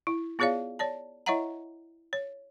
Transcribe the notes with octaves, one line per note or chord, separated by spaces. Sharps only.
E4
B3 F4 G#4 C#5 D5 F5
C#5 D5 A5
E4 C#5 D#5 E5 F#5 A#5
C#5